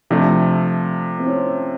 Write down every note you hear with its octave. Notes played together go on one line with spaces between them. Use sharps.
C3 F3 A3 D4
C4
C#4